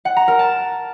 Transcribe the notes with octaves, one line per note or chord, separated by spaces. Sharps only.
F#5
A#5
A#4
A5